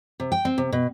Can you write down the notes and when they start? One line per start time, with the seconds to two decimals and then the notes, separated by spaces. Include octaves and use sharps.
0.20 C3
0.32 G5
0.45 C4
0.58 C3
0.72 B2